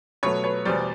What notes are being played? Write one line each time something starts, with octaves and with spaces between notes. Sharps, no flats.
B2 F#3 A3 B4 C#5
B4 C#5
E2 B2 G3 C5 D5